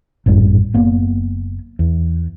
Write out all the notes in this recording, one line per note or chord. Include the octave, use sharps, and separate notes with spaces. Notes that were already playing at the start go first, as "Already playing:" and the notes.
G#1 F#2 A2 G3
F#1 A#3 B3
E2